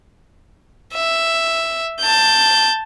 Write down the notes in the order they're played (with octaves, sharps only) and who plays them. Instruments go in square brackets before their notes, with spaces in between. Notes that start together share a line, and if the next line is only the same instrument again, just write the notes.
[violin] E5
A5 G6